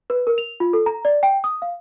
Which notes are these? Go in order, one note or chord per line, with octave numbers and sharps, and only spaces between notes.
B4
A#4
F7
F4
A4
A#5
D5
G5
D#6
F5